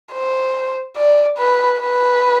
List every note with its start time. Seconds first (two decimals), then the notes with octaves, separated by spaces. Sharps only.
0.13 C5
0.97 D5
1.38 B4
1.80 B4